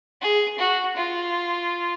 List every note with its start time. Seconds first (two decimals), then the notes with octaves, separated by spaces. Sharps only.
0.22 G#4
0.59 F#4
0.96 F4